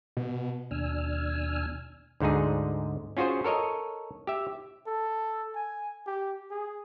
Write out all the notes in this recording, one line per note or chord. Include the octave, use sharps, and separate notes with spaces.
B2
D#2 B2 D4 G#5 E6 F6
D2 G#2 D3 D#4 G#4
C#4 F4 F#4 G#4 C5
A4 A#4 C#5 D#5
G4 E5
A4
G#5
G4
G#4